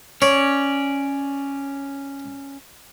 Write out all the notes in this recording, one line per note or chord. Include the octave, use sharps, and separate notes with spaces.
C#4 C#5 D5